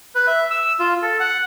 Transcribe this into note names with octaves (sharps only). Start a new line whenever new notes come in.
B4
E5
E6
F4
A4
F#5